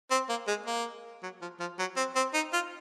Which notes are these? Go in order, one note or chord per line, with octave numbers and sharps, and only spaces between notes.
C4
A#3
G#3
A#3
F#3
F3
F3
F#3
C4
C4
D#4
F4